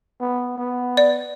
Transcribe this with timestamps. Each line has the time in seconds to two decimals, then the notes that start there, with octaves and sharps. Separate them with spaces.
0.21 B3
0.58 B3
0.97 D5